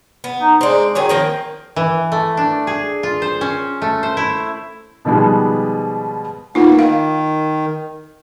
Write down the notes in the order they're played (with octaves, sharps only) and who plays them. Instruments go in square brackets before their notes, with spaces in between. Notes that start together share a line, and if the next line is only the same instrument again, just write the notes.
[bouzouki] B3
[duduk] D#4
[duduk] G#3 [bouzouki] C4 D4
[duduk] D#3 [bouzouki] F#3 C#4 G#4
[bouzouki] F3 A#3 C4
[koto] E3
A3
D4
G#4
F4
C5
C#4
A3
C5
E4
[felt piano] B2 D#3 F3 G3 G#3 B3
[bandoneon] A#3 B3 [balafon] D#4 F4
[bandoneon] D#3 [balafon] F5